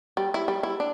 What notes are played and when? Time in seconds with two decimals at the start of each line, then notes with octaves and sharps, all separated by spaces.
0.17 G3
0.34 E4
0.48 G3
0.63 E4
0.80 D4